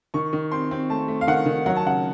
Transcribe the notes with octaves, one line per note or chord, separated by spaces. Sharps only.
D#3 C#6
D#3
C4 C6
C4
A3 A5
A3
F5
D#3 F#5
D#3
F#3 F#5
A5
C#3 F#5